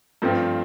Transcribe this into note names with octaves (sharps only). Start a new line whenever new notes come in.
G2 F3 A3 C4